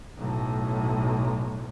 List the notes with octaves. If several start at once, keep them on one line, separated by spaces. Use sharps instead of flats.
B1 A2